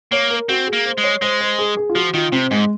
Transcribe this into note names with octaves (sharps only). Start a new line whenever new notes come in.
A#3 C#5
A#4
C4 F#4
G#4
A#3
C5
G#3
C#5
G#3 C5
C5
G#4
G#4
F4
F3 F#4
D#3 F4
C3 C4
G#2 G#3